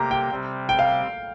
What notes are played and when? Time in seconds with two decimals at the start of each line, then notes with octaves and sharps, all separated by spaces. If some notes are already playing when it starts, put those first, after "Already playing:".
Already playing: C3 A#3 G4 A#5
0.11 G5
0.31 C3 G3 C4
0.69 G5
0.79 F5